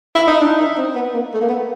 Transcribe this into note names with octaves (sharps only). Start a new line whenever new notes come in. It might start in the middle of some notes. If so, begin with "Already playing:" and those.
E4
D#4
D4
D#4
C4
B3
A#3
A3
A#3
B3